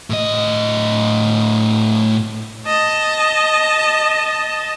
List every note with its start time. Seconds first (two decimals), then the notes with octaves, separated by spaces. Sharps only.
0.10 A2 D#5
2.66 D#5 A5